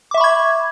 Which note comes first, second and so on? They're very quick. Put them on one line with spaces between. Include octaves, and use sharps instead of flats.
D6 E5 C#6 B5 G#6